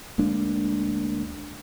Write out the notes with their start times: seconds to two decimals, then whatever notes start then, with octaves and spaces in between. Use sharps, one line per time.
0.18 D2 G#3 A#3 D4